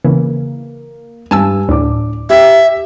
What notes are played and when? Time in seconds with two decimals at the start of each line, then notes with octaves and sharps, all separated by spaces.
0.04 C#3 E3 A#3
1.31 G2 G#5 A5 E6
1.69 D2 A2 D4 D6
2.30 G4 E5